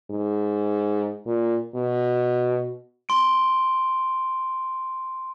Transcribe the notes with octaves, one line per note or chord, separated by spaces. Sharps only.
G#2
A#2
B2
C6 D7